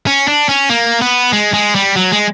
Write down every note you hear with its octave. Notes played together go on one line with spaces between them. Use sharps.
C#4
D4
C#4
A#3
B3
G#3
G#3
G3
F#3
G#3